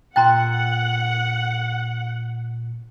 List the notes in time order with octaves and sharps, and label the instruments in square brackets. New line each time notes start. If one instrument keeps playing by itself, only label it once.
[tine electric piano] A#2 F#6 A6 [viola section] F#5 [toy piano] G5 A#5 C6